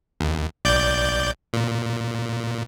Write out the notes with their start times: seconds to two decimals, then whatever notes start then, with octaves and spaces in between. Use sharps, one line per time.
0.20 D#2
0.65 B1 D5 G6
1.53 A#2